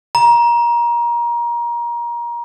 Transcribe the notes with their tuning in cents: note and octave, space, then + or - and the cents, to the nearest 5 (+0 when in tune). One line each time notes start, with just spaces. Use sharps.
A#5 +25